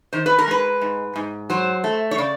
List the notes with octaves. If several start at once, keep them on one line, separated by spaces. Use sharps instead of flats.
D#3 C5
B4
A#4
G#3 B4
G#2
G#2
F#3 C5
A3
C#5
C#3 D5